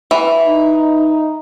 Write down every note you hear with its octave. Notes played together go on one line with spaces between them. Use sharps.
E3
D#4